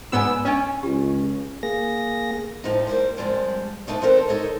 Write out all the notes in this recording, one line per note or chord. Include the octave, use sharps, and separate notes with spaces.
G#2 B3 F#4 D5 G#5 E6
C#4 D4 D#5 G#5
C#2 G4
A#3 G#4 A#6
F2 A2 F3 D#4
G3 A#3 C5
F2 G3 G#3 D4
D2 A3 D4 D#4 C#5
C4 D4 A4 A#4 C5
D#4 A4 C#5 D#5